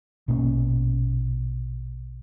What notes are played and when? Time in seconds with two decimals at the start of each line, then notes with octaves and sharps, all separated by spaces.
0.28 A#1 B2 A#3 C#4